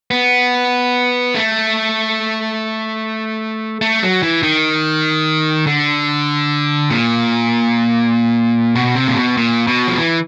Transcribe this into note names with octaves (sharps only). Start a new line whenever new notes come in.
B3
A3
A3
F#3
E3
D#3
D3
A#2
B2
C3
A#2
B2
A#2
B2
F3
E3